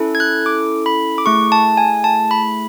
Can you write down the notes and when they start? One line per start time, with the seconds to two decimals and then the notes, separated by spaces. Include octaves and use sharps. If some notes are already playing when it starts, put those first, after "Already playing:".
Already playing: C#4 E4 A4
0.15 G#6
0.20 F#6
0.46 D6
0.86 B5
1.18 D6
1.25 A3 E4 G#4 C#6
1.52 A5
1.77 G#5
2.04 A5
2.31 B5